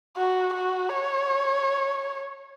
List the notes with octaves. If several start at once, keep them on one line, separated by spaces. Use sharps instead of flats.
F#4
F#4
C#5